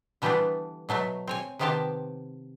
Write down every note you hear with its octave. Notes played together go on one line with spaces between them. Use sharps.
D3 E3 G3 A3 B3 D4
B2 F#3 A3 E5
C4 C#5 G#5
C3 D#3 B3 C4 G4 A5